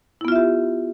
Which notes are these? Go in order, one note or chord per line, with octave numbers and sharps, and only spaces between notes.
B3 E4 F4 G4 E5